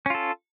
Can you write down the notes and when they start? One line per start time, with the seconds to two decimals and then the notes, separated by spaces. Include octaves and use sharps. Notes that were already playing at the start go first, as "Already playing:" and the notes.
0.06 C#4
0.10 F4
0.15 A4